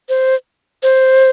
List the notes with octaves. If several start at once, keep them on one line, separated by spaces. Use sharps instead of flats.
C5
C5